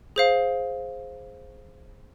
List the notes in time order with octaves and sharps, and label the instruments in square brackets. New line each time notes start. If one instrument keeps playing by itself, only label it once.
[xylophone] G#4 C5 F5